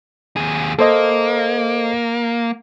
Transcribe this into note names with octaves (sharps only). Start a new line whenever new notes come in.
D#2 G#4
A#3 A4 C5 D#5